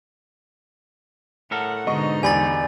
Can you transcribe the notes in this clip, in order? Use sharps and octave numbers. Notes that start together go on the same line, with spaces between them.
A2 A4 A#4 F#5
G#2 B2 D3 D#4 D#5 C#6
E2 G4 D5 G#5 B5 A6